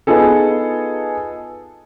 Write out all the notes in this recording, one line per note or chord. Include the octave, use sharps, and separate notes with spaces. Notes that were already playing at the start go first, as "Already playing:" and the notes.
B3 D#4 F4 G#4 A4